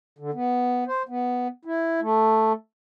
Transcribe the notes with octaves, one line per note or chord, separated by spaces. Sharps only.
D3
B3
C5
B3
E4
A3